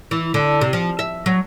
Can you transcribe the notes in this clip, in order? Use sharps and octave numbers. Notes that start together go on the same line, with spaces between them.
E3
D3
C3
F3
E5
F#3